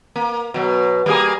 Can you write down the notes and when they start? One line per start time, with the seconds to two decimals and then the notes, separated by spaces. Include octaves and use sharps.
0.16 A#3
0.54 B2 F#3
1.06 G3 A#3 G#4